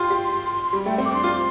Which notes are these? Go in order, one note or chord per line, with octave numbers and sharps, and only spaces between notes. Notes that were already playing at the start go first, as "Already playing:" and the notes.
Already playing: F4 G4 C6
G4
G3
A3 G5
C4
D6
D4 C6
F4